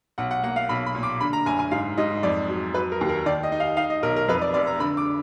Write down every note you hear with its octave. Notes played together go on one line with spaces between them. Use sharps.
B1 F#5
F#5
A#3 F#5
F5
B1 B5
B5
A#2
D6
D3 B5
A#5
F#1 G#5
G#5
G#2 F5
G#2 D#5
F2 D5
F#3
F#3 B4
A#4
D#2
A#4
D#3 D5
D#5
D#4
F5
D#4 F5
D#5
B1 A#4
A#4
F2 B4
D5
F1 D5
A#5
D3 B5
D6